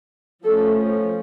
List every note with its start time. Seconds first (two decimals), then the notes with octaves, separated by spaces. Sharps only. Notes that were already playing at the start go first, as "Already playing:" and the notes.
0.45 F3 A3 C#4 A4